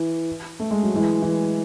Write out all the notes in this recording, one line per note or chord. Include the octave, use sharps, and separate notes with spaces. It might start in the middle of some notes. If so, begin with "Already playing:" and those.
Already playing: E3
A3
G#3
F#3
E3 G#3
E3